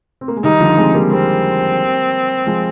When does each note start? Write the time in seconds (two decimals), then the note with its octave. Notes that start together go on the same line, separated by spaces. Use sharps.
0.21 C4
0.28 A#3
0.36 G#3
0.44 D#3 G3 D#4
0.60 D3 F3
0.77 G#3 C4
0.94 G3 A#3
1.11 G3 A#3 C4
2.46 F3 G#3